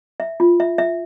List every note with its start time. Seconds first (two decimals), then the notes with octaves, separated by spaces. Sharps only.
0.20 E5
0.40 F4
0.60 E5
0.78 E5